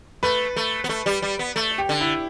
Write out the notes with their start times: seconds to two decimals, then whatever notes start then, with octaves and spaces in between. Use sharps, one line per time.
0.23 A3 B4
0.56 A3
0.84 B3
0.89 A3
1.06 G3
1.22 G3
1.39 B3
1.56 A3
1.78 G4
1.89 D3
2.01 E4